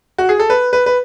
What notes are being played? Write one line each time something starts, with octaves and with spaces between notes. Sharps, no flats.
F#4
G#4
A4
B4
B4
B4